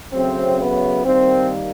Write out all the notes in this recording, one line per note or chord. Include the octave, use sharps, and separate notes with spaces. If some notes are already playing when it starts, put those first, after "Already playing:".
C#3 F#3 A3 C4
B3
D#3 G3 A#3 C4